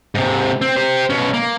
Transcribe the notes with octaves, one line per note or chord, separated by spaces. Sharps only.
G#2 C3
C4
G4 C5
B2 C#4
A#3